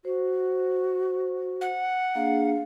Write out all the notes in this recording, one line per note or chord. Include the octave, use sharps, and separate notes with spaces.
F#4 C5
F#5
A#3 D4 G#4 F5